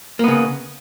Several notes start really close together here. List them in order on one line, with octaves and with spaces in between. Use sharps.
A#3 B3 C#3